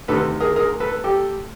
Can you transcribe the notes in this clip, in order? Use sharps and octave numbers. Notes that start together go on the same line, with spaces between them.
D2 C3 D#3 A4 B4
G#4 A#4
G#4 A#4
A4 B4
G4 A4